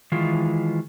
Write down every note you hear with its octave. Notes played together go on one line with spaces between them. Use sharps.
D#3 E3 G#3 F4